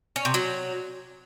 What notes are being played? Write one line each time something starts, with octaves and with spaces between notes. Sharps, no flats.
C#4
C3
F#3